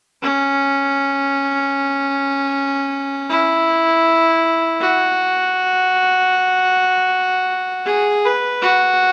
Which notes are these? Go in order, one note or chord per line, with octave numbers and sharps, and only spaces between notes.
C#4
E4
F#4
G#4
B4
F#4